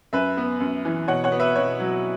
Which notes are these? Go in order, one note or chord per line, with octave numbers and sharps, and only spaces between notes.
F#2 B4 E5
B3
F#2
E3
B2 C#5 F#5
C#5 F#5
B3
B4 E5
B2 C#5
F#3